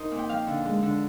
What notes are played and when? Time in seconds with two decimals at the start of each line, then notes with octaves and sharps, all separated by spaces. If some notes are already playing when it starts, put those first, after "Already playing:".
Already playing: D#4 A#4 C5 D#5
0.11 A#2
0.19 G5
0.29 F3 F5
0.47 D3
0.65 G#3
0.83 D3